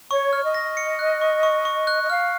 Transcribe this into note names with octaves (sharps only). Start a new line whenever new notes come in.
C#5 C#6
F6
D#5
A#6
C#7
F#6
C#6
C#6
C#6
F#6
D#5
F5 F6